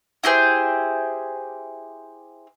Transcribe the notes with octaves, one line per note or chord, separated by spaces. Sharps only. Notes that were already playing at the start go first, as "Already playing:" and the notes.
E4 G4 G#4 C5